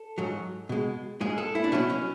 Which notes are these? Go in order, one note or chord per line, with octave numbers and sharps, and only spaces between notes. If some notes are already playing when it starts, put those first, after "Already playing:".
Already playing: A4
G#2 F#3
B2 G#3
G#2 G#3 G#4
A4
E4
D4
B2 F#3 C#4
C#4